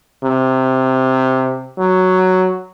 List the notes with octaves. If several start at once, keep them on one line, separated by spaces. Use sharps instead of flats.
C3
F#3